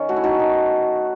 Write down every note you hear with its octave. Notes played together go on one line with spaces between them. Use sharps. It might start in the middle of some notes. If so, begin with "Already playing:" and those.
Already playing: D#3 C#4 C#5
A3 F#4
E4
D#4 F#4
D#3